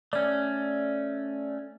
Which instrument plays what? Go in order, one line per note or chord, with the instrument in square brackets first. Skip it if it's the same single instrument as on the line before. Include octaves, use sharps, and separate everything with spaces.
[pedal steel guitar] A3 C#4 [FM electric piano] D5